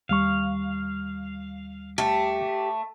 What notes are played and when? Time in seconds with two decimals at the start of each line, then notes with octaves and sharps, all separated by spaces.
0.09 D#2 G3 F5 C#6
1.98 A3 G4